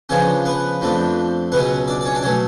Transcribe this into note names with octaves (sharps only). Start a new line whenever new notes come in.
C#3 F3 B3 C#4 D4 C#5
B3 B4
F2 F3 A3 D4
C#2 B2 F#3 B3 C#4 B4
D4 D5
D5
C#4 C#5
D4 D5
B2 F#3 A3 C#4 C#5